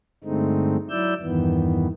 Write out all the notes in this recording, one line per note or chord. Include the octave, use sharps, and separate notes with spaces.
G2 D3 G#3 A3 C4 D#4
F#3 E4 D5 E6 G6
E2 G2 D#3 E3 B3